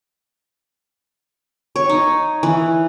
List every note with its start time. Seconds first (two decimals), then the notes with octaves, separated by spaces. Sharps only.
1.76 C#5
1.89 D#4
2.43 E3